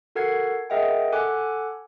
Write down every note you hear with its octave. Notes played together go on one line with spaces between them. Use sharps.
F#4 A4 A#4 F#5 G#6 C7
G#4 A#4 D#5 E5 F#5 G5
A4 F#5 G#5 D6 F#6